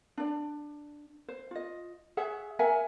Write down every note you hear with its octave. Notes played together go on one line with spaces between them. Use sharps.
D4 D5
C5
F4 D#5
G#4 C#5 E5 F#5
A#4 E5 F#5 G#5